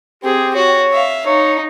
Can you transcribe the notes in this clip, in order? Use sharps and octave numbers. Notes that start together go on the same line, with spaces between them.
C4 G4 G#4
F#4 C#5
E5 F5
D#4 C#5